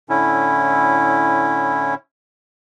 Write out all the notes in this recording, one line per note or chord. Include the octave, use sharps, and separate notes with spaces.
A2 D3 C#4 E4